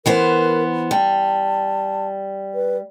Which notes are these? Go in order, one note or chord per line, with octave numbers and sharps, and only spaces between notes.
E3 B3 A#4 C5
G3 A5
B4